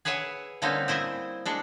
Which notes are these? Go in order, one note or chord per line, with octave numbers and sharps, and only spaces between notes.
G#4 B4 C#5 E5 F#5
D3 G3 A#3 C4 C#4 D#4
C4 E4 C5 D#5
G#3 D4 A4